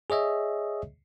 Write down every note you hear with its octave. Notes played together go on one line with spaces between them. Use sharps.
G#4 C#5 D#5 E5